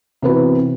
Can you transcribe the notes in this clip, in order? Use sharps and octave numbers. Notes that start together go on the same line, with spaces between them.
C3 E3 B3 F#4 B4